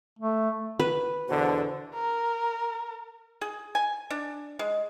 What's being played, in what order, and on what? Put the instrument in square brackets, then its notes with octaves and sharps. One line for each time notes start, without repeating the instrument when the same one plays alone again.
[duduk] A3
[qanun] B4
[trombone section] E2 B2 D3 [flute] C5
[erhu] A#4
[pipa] G#4
G#5
D4
G#3